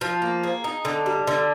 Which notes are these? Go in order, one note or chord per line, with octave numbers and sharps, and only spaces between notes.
F3
A#3
G#4
D#4
D3
G3
D3